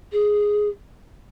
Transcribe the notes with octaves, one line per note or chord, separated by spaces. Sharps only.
G#4